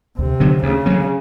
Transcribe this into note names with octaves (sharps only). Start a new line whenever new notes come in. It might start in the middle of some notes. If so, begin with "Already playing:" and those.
D2 C3
D3 F#3 B3
D2 C#3
D3 F#3 B3